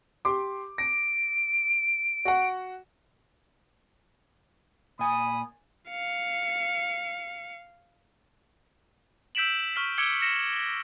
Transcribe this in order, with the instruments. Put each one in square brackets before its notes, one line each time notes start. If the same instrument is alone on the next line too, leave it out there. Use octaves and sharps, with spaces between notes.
[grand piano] G4 C6 D6
[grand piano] A#6 [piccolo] D7
[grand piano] F#4 F#5
[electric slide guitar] A#2 G#5 [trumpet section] B5 D#6
[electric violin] F5 C#7
[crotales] E6 G6 B6 D7 E7 F#7
C#6 F6 B6
D6 E6 G#6 C#7 D7 G7
A#6 C#7 E7